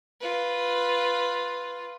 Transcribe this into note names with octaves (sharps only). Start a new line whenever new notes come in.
F4 B4